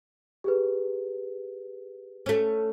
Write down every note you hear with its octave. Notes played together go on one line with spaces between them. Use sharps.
G4 G#4 B4
A3 C#4